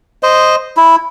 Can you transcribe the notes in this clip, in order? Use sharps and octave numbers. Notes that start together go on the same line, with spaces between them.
C5 D#5
E4